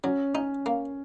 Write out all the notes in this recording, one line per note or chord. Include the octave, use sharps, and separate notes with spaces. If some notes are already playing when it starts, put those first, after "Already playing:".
F#3 C#4
C#4 D#4
A#3